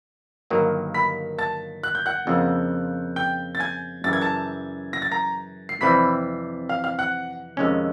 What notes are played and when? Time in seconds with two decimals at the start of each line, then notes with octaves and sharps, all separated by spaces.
0.50 G1 G2 D#3 F#3 A#3
0.94 B5 B6
1.38 A5 A6
1.83 F#6
1.95 G6
2.06 F#5 F#6
2.27 F2 C#3 F3 A#3
3.16 G5 G6
3.55 A6
3.60 G#5 G#6
4.04 F#2 C#3 E3 G3 A6
4.13 G#6
4.21 A5 A6
4.93 A#6
5.02 A6
5.11 A#5 A#6
5.69 C7
5.81 F2 C3 E3 G3 C4 B5 B6
6.69 F5 F6
6.84 F5 F6
6.99 F#5 F#6
7.57 F2 C3 D#3 G#3 C#4